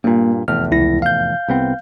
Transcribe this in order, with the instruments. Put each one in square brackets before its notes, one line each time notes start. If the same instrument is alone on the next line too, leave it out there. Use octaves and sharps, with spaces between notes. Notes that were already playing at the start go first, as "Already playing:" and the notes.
[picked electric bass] G2 A#2 [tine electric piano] A#3
[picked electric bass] F1 E2 A2 [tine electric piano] F6
[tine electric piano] C#2 E4 A#6
F5 G6
[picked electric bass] C2 B3 C4